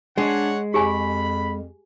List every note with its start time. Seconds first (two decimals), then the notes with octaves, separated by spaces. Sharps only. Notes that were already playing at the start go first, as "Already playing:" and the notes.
0.18 G#3 D4 C#5 F#5
0.74 F2 G4 G#4 G#5 B5